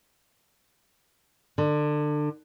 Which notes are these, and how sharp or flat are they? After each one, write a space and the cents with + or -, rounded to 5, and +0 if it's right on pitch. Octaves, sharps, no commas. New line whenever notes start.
D3 +25